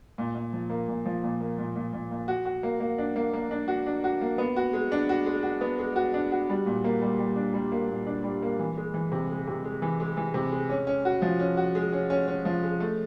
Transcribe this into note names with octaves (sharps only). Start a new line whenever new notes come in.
A#2
A#2
F3
A#3
A#2
F3
A#2
A#3
A#2
A#2
A#2
A#2
F#4
F#4
A#3
A#3
D4
A#3
A#3
D4
F#4
D4
F#4
A#3
B3
F#4
G#3
D4
F#4
G#3
F#4
B3
G#3
F#4
D4
F#4
G3
A#2
A#3
G3
G3
D4
G3
A#3
A#2
D4
G3
A#3
E3
G#3
E3
C3
G#3
C3
G#3
E3
G#3
E3
C3
G#3
C#4
C#4
F#4
F3
C#4
F#4
G#3
C#4
C#4
C#4
F3
G#3
A3